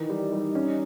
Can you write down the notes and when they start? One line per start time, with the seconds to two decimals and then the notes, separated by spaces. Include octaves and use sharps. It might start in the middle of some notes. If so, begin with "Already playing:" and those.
Already playing: D#3 E3 D#4
0.10 G3
0.33 G3
0.55 C#4